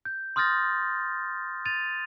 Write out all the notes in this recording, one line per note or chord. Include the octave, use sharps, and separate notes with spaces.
G6
C6 D#6 F6 G6 A6 A#6
A6 D#7 F7